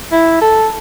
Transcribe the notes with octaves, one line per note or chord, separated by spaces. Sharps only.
E4
A4